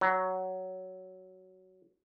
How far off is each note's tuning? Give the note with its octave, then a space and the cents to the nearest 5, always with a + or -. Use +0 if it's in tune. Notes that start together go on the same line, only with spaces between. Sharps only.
F#3 +10